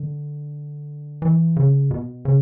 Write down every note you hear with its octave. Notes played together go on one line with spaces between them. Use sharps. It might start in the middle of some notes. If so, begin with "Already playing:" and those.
Already playing: D3
E3
C#3
B2
C#3